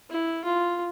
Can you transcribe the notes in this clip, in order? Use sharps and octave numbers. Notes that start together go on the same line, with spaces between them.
E4
F4